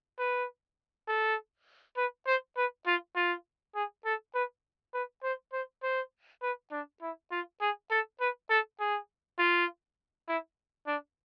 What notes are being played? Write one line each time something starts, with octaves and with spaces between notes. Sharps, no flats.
B4
A4
B4
C5
B4
F4
F4
G#4
A4
B4
B4
C5
C5
C5
B4
D4
E4
F4
G#4
A4
B4
A4
G#4
F4
E4
D4